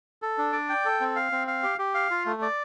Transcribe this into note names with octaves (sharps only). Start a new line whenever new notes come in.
A4
D4
D5
G5
A4
C4
F5
C4
F5
G4
G4
F5
F4
A3
D5